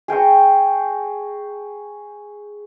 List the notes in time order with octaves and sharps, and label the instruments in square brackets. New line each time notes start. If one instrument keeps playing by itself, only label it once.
[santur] G#4 G5 A#5 C#6